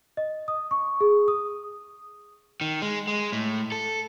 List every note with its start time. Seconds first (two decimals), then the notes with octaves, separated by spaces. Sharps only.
0.17 D#5
0.48 D#6
0.71 C#6
1.01 G#4
1.28 D#6
2.61 D#3
2.82 G#3
3.07 G#3
3.32 A2
3.72 A4